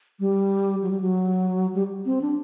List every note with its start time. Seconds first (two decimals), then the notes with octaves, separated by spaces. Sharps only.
0.20 G3
0.82 F#3
0.91 G3
1.01 F#3
1.74 G3
2.06 C4
2.22 D4